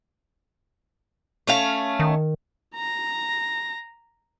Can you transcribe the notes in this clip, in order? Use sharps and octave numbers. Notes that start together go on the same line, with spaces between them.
A3 C#4 F5
D#3
A#5 A#6